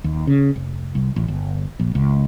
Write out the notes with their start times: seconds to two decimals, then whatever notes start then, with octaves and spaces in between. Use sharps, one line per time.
0.04 D#2
0.27 C#3
0.56 F1
0.95 C2
1.16 A1
1.28 G1
1.79 A#1
1.95 C#2